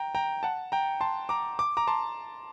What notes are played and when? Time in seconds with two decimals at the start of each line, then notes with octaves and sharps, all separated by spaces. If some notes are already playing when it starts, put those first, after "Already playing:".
Already playing: G5 A#5
0.15 G5 A#5
0.43 F#5 A5
0.72 G5 A#5
1.01 A5 C6
1.29 A#5 D6
1.59 D6
1.77 A#5 D6
1.88 A5 C6